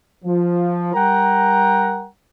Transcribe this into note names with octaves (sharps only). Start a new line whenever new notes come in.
F3
G3 A#4 F#5 G5 A#5